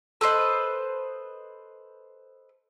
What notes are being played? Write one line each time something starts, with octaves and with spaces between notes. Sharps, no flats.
A4 B4 C5 D#5